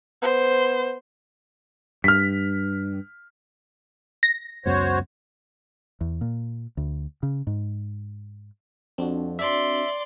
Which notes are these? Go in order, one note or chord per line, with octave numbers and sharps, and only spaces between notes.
B3 C5
G2 F6 B6
A#6
C#2 F#2 B3 F#4 C5 C#5
E2
A#2
D2
C#3
G#2
F2 C4 D4 F#4
D5 E5 C6